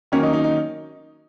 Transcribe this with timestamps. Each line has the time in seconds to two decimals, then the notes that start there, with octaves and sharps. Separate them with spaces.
0.12 D#3 F#3 A#3 C#4
0.23 D#4
0.33 D#4
0.44 D#4